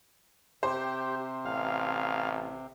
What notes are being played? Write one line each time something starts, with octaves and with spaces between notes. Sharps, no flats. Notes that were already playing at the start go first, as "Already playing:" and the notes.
C3 G4 C5
A1 F5